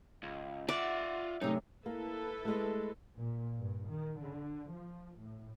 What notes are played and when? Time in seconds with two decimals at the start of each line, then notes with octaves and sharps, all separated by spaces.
0.23 C#2
0.69 F4 D5 E5 F#5
1.42 F#2 C3 A3 D#4
1.86 A#3 E4 A4 B4
2.45 G#3 A3
3.16 A#2
3.58 G2
3.88 D#3
4.21 D3
4.72 F3
5.20 A2